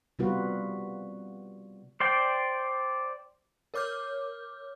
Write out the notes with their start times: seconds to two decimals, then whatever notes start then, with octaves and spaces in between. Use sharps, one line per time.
0.19 C3 G3 B3 F4 F#4 B4
2.00 C5 D5 G5
3.74 A#4 C#5 D6 F6 G6